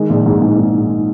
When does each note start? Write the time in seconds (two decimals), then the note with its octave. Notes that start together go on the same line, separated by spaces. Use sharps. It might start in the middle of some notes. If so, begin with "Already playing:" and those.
Already playing: D#3 G#3
0.10 A#1
0.26 G#2
0.42 G#2
0.58 G#2
0.74 G#2